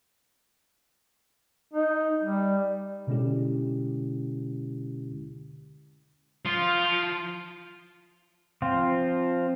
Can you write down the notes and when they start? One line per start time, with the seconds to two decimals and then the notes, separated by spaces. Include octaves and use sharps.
1.74 D#4
2.23 G3
3.07 B2 D3 G#3 C#4 E4 G4
6.45 F3 F4
8.62 F3 C4 F4